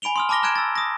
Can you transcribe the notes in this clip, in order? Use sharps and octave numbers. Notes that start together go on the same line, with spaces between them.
G#5 B5 D7 F7 G7
C6 D#6 F6
A5 B5 D6 F6 A#6 G7
A#5 F6 F#6 G#6 D7 E7
E6 A6
D#6 A#6